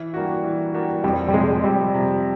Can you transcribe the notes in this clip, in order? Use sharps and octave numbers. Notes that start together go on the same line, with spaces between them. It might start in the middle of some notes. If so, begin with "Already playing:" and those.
Already playing: E3
G3 A#3 D4 F#4
E3
G3 A#3 D4 F#4
F2 G3
G3
C3 F3 G#3
F2 G3
C3 F3